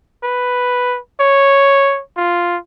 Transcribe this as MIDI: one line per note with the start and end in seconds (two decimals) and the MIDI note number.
0.23 0.98 71
1.20 2.01 73
2.17 2.57 65